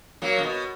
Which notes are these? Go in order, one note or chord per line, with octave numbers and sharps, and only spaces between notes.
F#3 A#3
C#3
B2